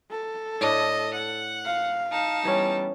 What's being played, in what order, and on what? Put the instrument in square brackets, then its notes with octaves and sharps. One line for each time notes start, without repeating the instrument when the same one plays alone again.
[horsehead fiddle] A4
[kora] A2 D4 E4 [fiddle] D#5
[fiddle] F#5
[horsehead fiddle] F5
[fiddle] D#4 A5
[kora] E3 C#4 [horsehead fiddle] G3 B3